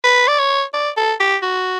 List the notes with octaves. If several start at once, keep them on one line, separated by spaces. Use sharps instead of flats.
B4
D5
C#5
D5
A4
G4
F#4